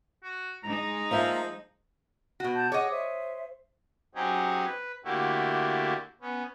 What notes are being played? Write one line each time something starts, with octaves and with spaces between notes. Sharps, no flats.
F#4
G#3 D#4 A#5
F3 A#3 C5 E5
B2 F#4
A5 G6
G#4 C#5 D#5 F#5 D6
C5 E5
F#3 C4 C#4 D#4 G4 G#4
B4
D3 A3 A#3 E4 F#4 G4
B3 C#4